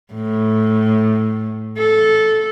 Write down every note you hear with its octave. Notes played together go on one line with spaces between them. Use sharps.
A2
A4